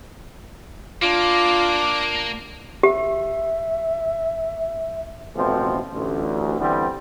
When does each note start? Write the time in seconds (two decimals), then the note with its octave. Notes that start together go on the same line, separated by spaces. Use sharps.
1.02 A#3 D4 F4 D6
2.83 G4 E5
5.36 A1 B2 F3 A3 C4
5.92 A1 D2
6.59 D3 E3 G3 B3 C4